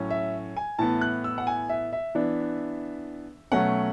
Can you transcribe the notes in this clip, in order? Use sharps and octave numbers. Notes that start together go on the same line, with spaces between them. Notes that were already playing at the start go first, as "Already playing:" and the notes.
Already playing: A2 F#3 C#4
E5
G#5
A2 E3 B3 A5
F#6
E6
F#5
G#5
E5
E5
E3 B3 D4
B2 F#3 A3 C#4 F#5